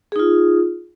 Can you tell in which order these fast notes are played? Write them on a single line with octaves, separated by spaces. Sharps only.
G#4 D#4 F4